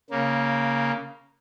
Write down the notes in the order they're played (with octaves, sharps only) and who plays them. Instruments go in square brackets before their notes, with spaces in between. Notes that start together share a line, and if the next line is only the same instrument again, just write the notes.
[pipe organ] C#3 A#3